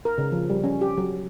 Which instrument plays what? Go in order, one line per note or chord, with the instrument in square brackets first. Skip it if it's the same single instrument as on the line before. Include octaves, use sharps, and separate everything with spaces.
[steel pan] A#4
C#3
F3
G3
C#4
G4
F#3